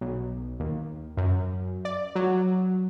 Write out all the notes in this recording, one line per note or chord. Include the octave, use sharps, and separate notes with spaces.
B1
D#2
F#2
D5
F#3